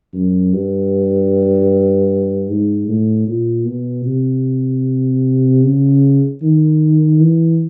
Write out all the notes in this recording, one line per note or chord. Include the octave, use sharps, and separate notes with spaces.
F#2
G2
G#2
A2
A#2
B2
C3
C#3
D#3
E3